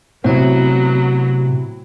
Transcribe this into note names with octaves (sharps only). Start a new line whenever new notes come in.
A2 C3 F#3 B3 C4 E4